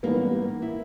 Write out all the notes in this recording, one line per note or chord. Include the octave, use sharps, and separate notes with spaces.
A1 G#2 E3 G3 A#3 B3
E4